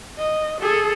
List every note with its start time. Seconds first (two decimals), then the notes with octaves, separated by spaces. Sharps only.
0.19 D#5
0.61 G#4 A4